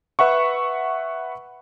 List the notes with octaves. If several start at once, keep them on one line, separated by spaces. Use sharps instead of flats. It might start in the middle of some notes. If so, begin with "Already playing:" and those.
B4 E5 F#5 C#6